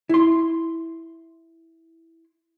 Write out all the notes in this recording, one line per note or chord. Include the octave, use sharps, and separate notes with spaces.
E4 C6